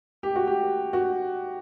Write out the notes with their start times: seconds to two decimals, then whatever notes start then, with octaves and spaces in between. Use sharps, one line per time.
0.23 G4
0.36 F#4
0.47 G4
0.93 F#4